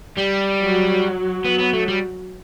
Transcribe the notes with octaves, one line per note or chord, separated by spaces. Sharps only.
G3
F#3
F#3 B3
B3
A3
G3